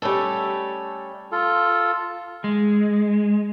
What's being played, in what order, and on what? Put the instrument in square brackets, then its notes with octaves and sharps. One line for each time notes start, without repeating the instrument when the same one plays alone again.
[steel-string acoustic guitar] G3 A3 C#4 A4
[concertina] F4 A4
[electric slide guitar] G#3